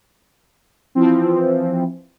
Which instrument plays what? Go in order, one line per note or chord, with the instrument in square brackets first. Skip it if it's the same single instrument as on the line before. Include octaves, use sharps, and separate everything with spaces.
[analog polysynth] E3 F3 C4